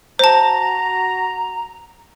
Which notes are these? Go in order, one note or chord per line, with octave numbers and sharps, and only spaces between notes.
F#4 C5 A5 A#5